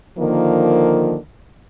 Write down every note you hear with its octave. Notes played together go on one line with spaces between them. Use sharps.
D3 D#3 F3 A#3